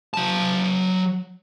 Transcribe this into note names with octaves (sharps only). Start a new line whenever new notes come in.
F#3 A5